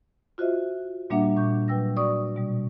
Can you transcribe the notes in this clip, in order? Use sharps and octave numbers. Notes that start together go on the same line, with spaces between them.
F4 F#4 C5 D#5 E5
A#2 G3 A#3 D4 E5 F#5
A#2 C#6 G6
F#3 B4 G5 E6 A#6
F#4 D5 C#6 D#6
B2 G3